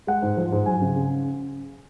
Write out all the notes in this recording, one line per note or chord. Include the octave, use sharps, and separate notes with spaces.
G#3 F#5
G#2
F3
G#2
F#3 G#5
C#3
C#3